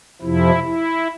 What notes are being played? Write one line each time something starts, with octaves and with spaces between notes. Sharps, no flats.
F2 C3 F3 E4
E4